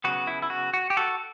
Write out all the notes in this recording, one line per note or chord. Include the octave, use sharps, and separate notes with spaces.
C#3 F#3 B3 F#4
E4
E4
F#4
F#4
G4
F#4 A4